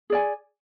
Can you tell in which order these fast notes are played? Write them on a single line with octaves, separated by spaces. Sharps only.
G#4 D5 G#5